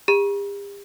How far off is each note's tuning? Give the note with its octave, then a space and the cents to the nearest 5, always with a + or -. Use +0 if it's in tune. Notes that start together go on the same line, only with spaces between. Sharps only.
G4 +45 A#5 +45